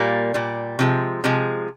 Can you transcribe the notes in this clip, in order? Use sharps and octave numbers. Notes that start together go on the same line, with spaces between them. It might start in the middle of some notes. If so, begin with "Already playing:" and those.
Already playing: A#2 G3 A#3
A#2 G3
C3 F3 G#3
C3 F3 G#3